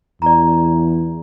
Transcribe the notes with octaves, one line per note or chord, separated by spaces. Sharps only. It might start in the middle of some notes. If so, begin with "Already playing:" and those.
E2 D5 A#5